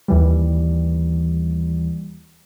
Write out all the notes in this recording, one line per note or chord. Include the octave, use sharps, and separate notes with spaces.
D#2 E3 G3